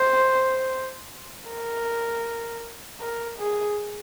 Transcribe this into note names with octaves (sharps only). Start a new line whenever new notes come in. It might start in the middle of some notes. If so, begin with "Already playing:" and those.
Already playing: C5
A#4
A#4
G#4